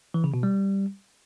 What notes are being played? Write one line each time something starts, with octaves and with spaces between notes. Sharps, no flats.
E3
C#3
B2
G3